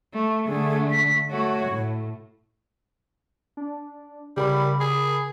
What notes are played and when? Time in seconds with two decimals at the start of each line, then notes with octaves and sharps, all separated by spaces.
0.14 A3
0.47 D3 A3 G#4
0.91 B6
1.30 A3 F#4 C#5
1.68 A2
3.57 D4
4.37 C#3 G3 A#4 B5
4.80 G#4